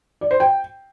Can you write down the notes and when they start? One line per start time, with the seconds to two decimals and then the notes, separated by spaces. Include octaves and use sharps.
0.21 D5
0.31 C5
0.40 G5